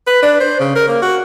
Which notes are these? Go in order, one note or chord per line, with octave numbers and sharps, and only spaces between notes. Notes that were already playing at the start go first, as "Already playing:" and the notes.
B4
D4
C5
C#3
A#4
A#3
F#4